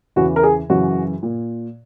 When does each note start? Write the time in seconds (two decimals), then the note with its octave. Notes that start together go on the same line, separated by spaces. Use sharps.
0.16 E2 C#3 E3 F#4
0.36 A#4
0.43 G#4
0.70 F#2 C#3 E3 F#4
1.23 A#2